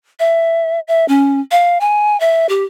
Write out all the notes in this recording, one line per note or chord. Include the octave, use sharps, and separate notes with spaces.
E5
E5
C#4
F5
G#5
E5
G4